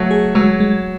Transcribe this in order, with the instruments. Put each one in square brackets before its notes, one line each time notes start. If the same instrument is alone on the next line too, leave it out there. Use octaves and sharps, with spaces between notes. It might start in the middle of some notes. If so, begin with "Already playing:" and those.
Already playing: [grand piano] F#3 A3
[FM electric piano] G#4
[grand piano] F#3 [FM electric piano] G#3
[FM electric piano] G#3